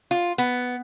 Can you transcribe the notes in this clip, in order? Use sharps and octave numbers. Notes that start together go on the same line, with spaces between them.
F4
B3